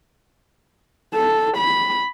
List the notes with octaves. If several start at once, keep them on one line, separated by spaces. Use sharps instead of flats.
A4
B5